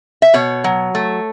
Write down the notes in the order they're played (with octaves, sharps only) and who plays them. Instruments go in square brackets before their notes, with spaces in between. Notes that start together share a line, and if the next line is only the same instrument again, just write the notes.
[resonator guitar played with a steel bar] E5
B2 C#5
F#3
A3